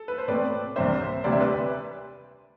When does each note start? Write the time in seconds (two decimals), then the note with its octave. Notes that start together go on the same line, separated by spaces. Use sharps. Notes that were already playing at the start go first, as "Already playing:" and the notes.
Already playing: A4
0.08 B4
0.18 C5
0.28 B2 A3 C4 B4 D5
0.76 C2 C3 G3 D4 C5 E5
1.24 D2 C3 G3 C4 D5
1.32 E5
1.40 B4 D5